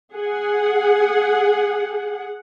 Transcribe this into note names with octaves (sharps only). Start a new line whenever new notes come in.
G#4 F#5